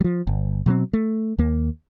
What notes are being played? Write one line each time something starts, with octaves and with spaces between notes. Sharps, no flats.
F3 G3
G1
B2 F#3 A#3 C4
A3
D#2 A#3